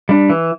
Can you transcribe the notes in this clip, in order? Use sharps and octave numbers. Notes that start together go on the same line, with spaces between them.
G3 D4
E3